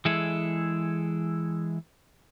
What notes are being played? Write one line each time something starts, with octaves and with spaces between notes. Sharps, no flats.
E3 G#3 E4 G#4 A4